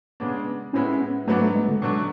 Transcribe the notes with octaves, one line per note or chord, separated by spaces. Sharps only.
C#3 G#3 B3 D4
A2 G#3 B3 C#4 E4
B3
G#2 F#3 A3 B3 D4
A3
G#3
D3
B2 F#3 A3 D4